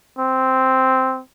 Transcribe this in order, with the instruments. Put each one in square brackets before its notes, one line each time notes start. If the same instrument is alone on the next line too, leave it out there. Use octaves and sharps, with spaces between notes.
[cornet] C4